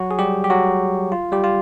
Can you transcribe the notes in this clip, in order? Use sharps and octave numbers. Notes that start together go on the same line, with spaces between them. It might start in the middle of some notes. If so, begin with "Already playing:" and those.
Already playing: F#3 F#4
G#4
G3 G4
G4
F#3 F#4
F4
G3 G4
F4